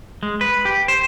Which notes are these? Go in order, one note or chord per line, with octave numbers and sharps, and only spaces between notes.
G#3
B4
G4
C5